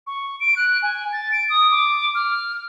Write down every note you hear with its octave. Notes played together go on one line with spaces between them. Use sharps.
C#6
D7
F#6
G#5
A6
D7
D#6
D6
F6